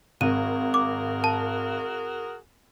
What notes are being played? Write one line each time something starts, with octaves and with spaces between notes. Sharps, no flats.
G#1 F#4 G#4 A#4 D#7
D6
A5